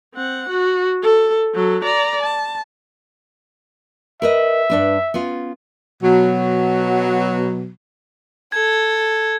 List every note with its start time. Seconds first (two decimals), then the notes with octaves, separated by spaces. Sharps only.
0.14 C4 F#5
0.49 F#4
1.03 A4
1.55 F#3 A4
1.84 D5 A#5
2.23 A5
4.22 A#4 B4 D#5 E5
4.70 G2 D4 B4
5.14 B3 C#4 F4
6.03 B2 F#3
8.52 A4 G#6